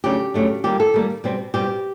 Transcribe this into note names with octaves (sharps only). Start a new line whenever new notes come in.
C#3 F#3 A3 D4 G4
C#3 F#3 A3 D4
D#3 G3 A#3 G4
A4
D#3 G3 A#3
B2 G3 C4
B2 G3 C4 G4